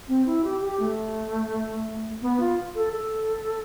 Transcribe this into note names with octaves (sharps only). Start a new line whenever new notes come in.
C4
E4
G4
G4
A3
B3
F4
A4
A4